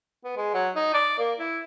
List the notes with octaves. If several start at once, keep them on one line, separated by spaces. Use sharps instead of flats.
B3
G#3
F#3
D#4
D5
A#3
E4